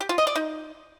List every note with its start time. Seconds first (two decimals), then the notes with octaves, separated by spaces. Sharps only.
0.01 G4
0.09 F4
0.18 D#5
0.27 D5
0.36 D#4